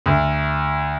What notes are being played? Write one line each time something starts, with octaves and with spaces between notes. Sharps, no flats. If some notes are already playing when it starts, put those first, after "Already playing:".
D2